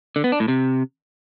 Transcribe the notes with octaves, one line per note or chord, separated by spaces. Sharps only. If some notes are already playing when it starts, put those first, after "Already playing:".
D3
B3
D4
A2
C3